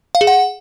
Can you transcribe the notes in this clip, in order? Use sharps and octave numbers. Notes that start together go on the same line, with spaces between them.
F5
G#4
F#5